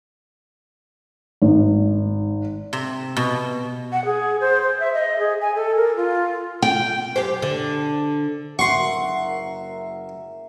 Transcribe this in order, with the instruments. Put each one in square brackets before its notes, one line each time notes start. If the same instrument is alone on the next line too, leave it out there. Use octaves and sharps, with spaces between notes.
[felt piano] G#1
[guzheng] C3
B2
[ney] F#5
G#4
C5
C5
E5
D#5
G#4
G#5
A4
A#4
F4
[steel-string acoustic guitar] G5
[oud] F#2 G4 C5
D3
[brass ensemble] F#1 A#4 E5 [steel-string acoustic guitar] F#5 [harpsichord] C6 C#6